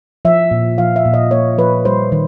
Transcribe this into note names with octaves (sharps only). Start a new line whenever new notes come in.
F3 E5
A#2
F3 F5
E5
A#2
D#5
A#3 C#5
F3 B4
G3 C5
D#3